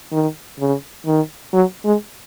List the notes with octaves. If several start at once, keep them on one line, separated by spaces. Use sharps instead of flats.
D#3
C#3
D#3
F#3
G#3